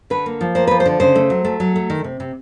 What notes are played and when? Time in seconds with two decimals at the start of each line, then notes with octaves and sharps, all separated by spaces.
0.10 D3 B4
0.26 A#3
0.41 F3
0.55 A#3 C5
0.67 F3 B4
0.80 C5
0.86 D3
1.00 C#3 C5
1.15 A3
1.30 F#3
1.45 A3
1.60 F#3
1.76 A3
1.90 D#3
2.04 C3
2.20 C3